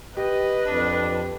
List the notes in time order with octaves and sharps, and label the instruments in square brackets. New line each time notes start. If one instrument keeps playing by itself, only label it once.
[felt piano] G4 [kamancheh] B4 [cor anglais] D#5
[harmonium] F2 [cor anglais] D4